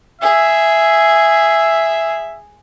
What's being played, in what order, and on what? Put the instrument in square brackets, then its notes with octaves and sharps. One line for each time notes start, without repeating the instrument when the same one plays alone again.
[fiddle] G#4 [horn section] E5